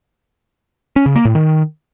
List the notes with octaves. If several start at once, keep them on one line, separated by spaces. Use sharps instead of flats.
C#4
C#3
A#3
A2
D#3